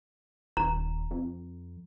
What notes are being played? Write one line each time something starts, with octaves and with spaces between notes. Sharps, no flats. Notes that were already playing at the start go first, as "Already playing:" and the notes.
D#1 A#5
F2